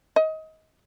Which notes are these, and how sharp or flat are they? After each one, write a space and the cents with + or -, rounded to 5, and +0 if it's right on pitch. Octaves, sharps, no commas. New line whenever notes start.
D#5 +25